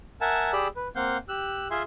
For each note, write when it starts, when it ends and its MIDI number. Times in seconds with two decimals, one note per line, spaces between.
0.21 0.52 70
0.21 0.52 76
0.21 0.52 78
0.21 0.52 80
0.21 0.52 81
0.53 0.68 67
0.53 0.68 68
0.53 0.68 74
0.53 0.68 83
0.53 0.68 88
0.76 0.88 71
0.96 1.17 58
0.96 1.17 60
0.96 1.17 77
0.96 1.17 78
0.96 1.17 91
1.29 1.68 67
1.29 1.68 88
1.29 1.68 90
1.71 1.83 65
1.71 1.83 68
1.71 1.83 76
1.71 1.83 80
1.71 1.83 84